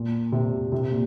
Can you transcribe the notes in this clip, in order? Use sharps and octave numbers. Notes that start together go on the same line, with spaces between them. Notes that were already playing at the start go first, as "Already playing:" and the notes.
Already playing: A#2
C3
C3
A#2